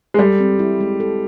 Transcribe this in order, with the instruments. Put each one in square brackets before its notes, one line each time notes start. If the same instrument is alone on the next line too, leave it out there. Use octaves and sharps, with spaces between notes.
[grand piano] G#3
[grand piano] G3 [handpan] A4
[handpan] C4
E4
G#3
A4